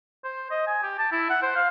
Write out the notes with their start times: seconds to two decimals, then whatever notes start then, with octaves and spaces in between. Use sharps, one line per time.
0.24 C5
0.51 D#5
0.67 G#5
0.83 G4
0.99 A5
1.12 E4
1.30 F#5
1.43 C5
1.56 F5